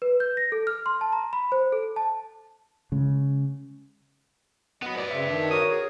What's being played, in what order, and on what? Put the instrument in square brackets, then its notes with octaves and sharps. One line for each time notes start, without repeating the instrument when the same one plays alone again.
[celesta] B4
G6
A#6
A4
F6
C6
A5
A#5
B5
C5
A4
A5
[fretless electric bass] C#3 G#3
[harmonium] F#3 D#5 [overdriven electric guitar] B3 B4
[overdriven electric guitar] B4 D5
[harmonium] C#3 C4 [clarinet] E5
[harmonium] D#3 D4
[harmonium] F#4 A#4 C#5 [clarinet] D#6
[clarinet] G#4